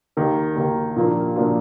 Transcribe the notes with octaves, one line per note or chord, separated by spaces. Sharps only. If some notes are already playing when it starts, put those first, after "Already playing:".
D#2 D#3 A#3
D#2 D#3 A#3
A#2 F3 A#3 D4 F4
A#2 F3 A#3 D4 F4